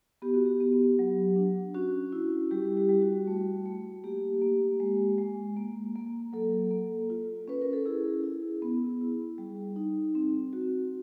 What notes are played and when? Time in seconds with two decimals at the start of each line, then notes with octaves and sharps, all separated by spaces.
0.22 B3 G4
0.34 F#4
0.46 G4
0.60 B3
0.99 F#3
1.36 D4
1.74 C#4 F#4
2.12 E4
2.51 G3 G4
2.77 G4
2.89 G3
3.02 F#4
3.27 A3
3.66 A3
4.04 A#3 G4
4.42 A#3
4.80 G#3
5.18 G#3
5.57 A#3
5.95 A#3
6.33 F#3 A4
6.71 A#3
7.10 F4
7.48 C#4 B4
7.62 A#4
7.73 A4
7.85 E4 G#4
8.24 E4
8.62 B3
9.01 E4
9.38 G3
9.76 D#4
10.15 C4
10.53 F#4